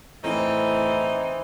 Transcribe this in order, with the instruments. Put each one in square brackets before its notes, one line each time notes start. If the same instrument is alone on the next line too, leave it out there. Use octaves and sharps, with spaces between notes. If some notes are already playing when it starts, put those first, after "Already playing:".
[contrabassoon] A2 [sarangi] E3 [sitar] C4 [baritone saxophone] D#4